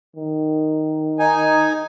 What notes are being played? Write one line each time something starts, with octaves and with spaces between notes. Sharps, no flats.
D#3
D#4 G#5